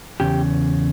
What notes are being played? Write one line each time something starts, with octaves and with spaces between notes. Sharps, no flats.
E2 C#3 G4